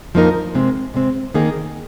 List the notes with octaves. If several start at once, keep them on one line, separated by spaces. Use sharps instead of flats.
F2 F3 A#3 D#4 A#4
C3 G#3 C4
C3 G#3 C4
D#3 A#3 D#4 G#4